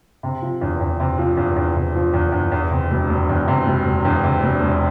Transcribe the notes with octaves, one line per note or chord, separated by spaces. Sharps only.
C3
F3
E2
E2
C3
F3
E2
E2
C3
F3
E2
E2
E2
C3
E1
E1
E2
C3
E1
E1
E2
C3
E1
E1